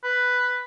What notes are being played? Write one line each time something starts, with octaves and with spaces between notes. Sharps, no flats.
B4